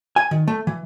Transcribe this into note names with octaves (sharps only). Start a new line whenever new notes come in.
G#5
D#3
A3
E3